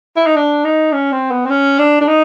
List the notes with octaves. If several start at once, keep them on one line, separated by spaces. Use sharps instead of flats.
E4
D#4
D4
D#4
C#4
C4
B3
C4
C#4
D4
D4
D#4